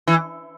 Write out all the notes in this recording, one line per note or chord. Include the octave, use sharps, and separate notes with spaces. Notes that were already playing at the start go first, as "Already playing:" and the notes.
E3